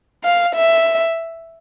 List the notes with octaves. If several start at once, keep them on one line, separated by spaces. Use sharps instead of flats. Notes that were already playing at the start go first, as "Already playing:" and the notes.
F5
E5